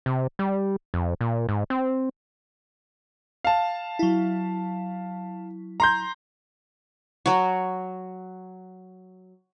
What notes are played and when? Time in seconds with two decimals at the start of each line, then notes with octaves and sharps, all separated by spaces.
0.06 C3
0.39 G3
0.94 F2
1.21 A#2
1.49 G#2
1.70 C4
3.44 F5 A5
3.99 F#3 E4
5.80 A#5 C6 G6
7.26 F#3 F#4